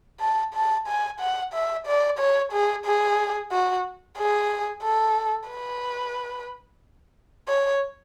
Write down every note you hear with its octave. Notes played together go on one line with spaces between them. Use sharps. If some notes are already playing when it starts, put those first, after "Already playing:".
A5
A5
G#5
F#5
E5
D5
C#5
G#4
G#4
F#4
G#4
A4
B4
C#5